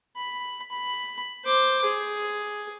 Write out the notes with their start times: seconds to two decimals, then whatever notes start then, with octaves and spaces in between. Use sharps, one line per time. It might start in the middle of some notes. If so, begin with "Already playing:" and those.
0.17 B5
0.72 B5
1.44 C5 D6
1.84 G#4